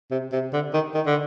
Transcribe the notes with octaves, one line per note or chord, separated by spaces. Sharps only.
C3
C3
D3
D#3
D#3
D3